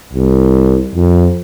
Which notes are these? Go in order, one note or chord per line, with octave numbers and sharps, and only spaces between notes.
C2
F2